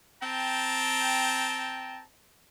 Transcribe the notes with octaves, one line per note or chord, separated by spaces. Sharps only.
C4 G5 A5 A#5